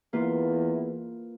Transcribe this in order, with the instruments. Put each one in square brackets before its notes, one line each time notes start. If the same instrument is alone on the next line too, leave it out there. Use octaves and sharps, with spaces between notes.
[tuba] E2 [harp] A#3 F4 B4